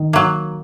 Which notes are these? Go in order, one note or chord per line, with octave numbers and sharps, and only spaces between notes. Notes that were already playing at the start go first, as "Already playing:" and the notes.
Already playing: D#3
F#3 A#3